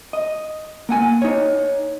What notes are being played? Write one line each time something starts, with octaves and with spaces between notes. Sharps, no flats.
D#5
A#3 F#5 G#5
D#4 C#5